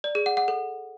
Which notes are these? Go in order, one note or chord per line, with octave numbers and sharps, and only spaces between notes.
D5
G#4
F#5
F#5
A4